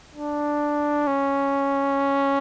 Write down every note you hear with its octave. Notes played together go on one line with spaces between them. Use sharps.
D4
C#4